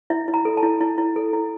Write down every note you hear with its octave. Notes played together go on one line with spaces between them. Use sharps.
E4 E5
E4
A#5
A4
A5
E4
E4
E4
A4
E4